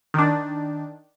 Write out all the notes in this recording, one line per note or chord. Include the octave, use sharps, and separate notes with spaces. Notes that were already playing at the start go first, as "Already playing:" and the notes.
D#3 D4